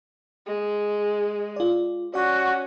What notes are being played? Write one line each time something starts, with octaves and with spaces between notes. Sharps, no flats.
G#3
F4 D5
C#4 F#4 D5 F#5